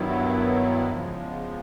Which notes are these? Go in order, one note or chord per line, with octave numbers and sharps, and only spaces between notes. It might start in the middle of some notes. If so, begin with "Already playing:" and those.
Already playing: G2 D#3 F#3 B3 E4
E2 C#3 F3 G#3